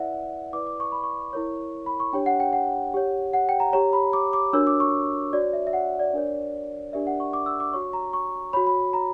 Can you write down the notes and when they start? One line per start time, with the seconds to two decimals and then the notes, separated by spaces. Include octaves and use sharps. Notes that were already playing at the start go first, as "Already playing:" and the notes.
Already playing: E4 B4 D5 E5 F#5
0.53 E4 B4 D5 D6
0.67 D6
0.80 C#6
0.92 B5
1.03 C#6
1.33 E4 A#4 C#5
1.86 B5
2.00 C#6
2.13 D4 G4 C#5 G5
2.26 F#5
2.40 G5
2.53 F#5
2.94 G4 C#5
3.34 F#5
3.49 G5
3.60 A#5
3.73 G4 C#5 A#5
3.93 B5
4.13 D6
4.33 D6
4.53 D4 F#4 A#4 C#5 E6
4.67 D6
4.80 C#6
5.33 F#4 C#5 D5
5.53 E5
5.67 E5
5.73 F#5
5.99 D5
6.13 D4 A#4 C#5
6.93 D4 G4 A#4 D5 E5
7.07 F#5
7.20 C#6
7.33 D6
7.46 E6
7.60 D6
7.73 F#4 C#5 C#6
7.93 A#5
8.13 C#6
8.53 F#4 C#5 B5
8.67 B5
8.93 A#5